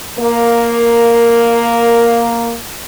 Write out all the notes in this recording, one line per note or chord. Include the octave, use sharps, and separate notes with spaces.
A#3 A#4